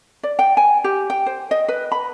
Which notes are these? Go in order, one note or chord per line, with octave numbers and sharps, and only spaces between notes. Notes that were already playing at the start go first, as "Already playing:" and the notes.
D5
G5
G#5
G4
G5
C5
D#5
B4
B5